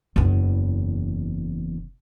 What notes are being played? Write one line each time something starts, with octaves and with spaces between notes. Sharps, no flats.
F#1 E2